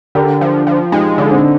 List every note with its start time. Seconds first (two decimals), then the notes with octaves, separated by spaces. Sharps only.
0.15 D3 G4 A#4
0.41 F3
0.67 F3
0.92 G#3 D#4 G4
1.18 D3
1.31 C4 D#4